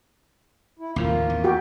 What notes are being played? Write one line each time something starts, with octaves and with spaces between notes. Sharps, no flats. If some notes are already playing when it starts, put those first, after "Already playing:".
E4
D#2 A2 F3 A#3 F4
E2
F#4 G4